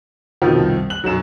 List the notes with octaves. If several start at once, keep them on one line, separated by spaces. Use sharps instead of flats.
F2 B2 D#3 F3
C2
F#6 F#7
B1 F#2 F#3 E7